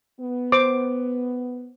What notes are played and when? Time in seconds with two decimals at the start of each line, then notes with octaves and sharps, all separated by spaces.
0.20 B3
0.52 C5 D6